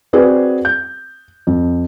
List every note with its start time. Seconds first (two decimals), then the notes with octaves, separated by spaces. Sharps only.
0.13 C4 F#4 G#4 B4 D5
0.65 G6
1.47 F2